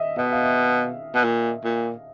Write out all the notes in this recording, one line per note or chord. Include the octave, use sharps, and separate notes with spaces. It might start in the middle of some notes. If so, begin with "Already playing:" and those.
Already playing: D#5 E5
B2 D#5
F5
E5
B2
A#2
A#2